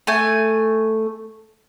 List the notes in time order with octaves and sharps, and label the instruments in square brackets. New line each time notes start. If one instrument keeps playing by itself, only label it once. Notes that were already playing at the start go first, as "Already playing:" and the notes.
[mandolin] A3 G#5